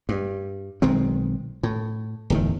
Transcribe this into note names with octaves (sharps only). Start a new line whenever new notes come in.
G2
B1 D#3 G#3 C4
A2
D1 E2 D#3